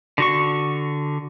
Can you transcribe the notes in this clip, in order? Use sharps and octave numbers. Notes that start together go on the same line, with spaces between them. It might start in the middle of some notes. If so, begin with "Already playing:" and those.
D3 F#4 C#6